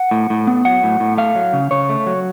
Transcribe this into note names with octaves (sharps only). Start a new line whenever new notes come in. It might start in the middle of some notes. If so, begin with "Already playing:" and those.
Already playing: F#5
A2
A2
B3
F#3 F#5
A2
A2
A3 F5
F#3
C#3
C#3 C#5
A3
F#3